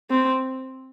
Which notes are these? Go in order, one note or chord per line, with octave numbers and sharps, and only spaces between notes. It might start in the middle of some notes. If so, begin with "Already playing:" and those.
C4